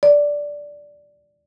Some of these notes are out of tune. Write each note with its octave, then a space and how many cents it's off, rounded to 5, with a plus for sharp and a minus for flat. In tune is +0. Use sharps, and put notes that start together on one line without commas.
D5 -5